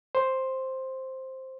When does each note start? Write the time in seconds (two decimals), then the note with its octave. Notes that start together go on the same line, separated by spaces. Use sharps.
0.15 C5